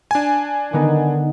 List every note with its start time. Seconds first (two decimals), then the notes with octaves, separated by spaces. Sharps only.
0.11 D4 G#5
0.73 D3 D#3 B3 D#4